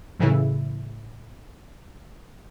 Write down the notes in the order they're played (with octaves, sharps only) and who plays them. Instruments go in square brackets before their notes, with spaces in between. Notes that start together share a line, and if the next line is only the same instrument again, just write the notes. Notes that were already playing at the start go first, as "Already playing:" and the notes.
[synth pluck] F#2 A2 C#3 E3 E4